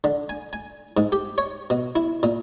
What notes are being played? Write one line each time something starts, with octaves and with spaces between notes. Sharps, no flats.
D3
G#5
G#5
G#2
G4
C#5
B2
E4
A#2